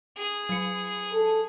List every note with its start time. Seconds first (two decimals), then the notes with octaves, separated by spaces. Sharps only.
0.17 G#4
0.49 F#3 C#7
1.12 A4